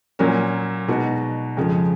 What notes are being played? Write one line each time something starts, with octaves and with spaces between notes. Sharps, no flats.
A#2 F#3 A#3 C#4
B2 G#3 D#4 F#4
F2 C#3 F3 G#3